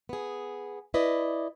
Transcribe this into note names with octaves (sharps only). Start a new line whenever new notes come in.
B3 G#4
E4 B4 D5 D#5